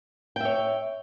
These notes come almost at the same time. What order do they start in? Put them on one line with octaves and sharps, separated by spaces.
G5 E5 C#5